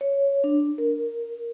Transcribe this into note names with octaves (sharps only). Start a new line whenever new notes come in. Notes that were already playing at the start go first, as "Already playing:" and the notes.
C#5
D4
A#4